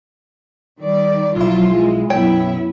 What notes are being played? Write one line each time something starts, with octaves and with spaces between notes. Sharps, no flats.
D#3 G3 D5
B1 F3 F#3 E4 F4
G#3
B1 F#2 B3 E4 C#5 G5